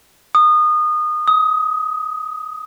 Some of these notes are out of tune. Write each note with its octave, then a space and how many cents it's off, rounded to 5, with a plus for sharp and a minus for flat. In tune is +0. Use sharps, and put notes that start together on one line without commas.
D#6 -25
D#6 +25